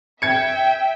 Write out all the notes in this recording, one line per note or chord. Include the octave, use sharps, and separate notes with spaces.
E5 G5 G#6 C#7